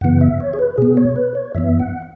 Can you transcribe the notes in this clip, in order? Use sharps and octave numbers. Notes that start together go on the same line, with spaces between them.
F#2 C#3 E3 B3 F#5
E5
C#5
G#4
B4
B2 B3 G#4
C#5
B4
C#5
F#2 E3 B3 E5
F#5